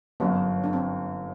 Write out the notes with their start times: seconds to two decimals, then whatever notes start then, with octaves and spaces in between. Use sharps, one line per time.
0.20 G1 F#2 F#3 B3
0.64 D4
0.73 C4